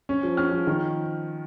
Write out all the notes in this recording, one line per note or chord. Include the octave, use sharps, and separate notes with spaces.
C#4
F3
C#4 F6
F3
D#3